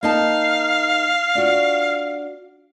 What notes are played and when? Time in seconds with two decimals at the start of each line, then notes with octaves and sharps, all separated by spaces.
0.03 A#3 D#4 F5 A5
1.35 D4 F4 F#4